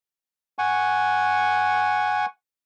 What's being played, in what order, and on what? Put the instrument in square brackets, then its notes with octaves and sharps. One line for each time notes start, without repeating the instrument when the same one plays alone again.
[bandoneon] F#5 G#5 C#6